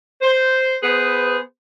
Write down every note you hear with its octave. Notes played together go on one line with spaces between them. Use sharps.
C5
B3 G#4 B4 C5